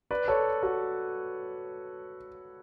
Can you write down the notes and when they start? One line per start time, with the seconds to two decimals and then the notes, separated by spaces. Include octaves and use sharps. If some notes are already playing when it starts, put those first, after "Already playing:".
0.11 B4 D5
0.28 A4 C#5
0.63 F#4 A4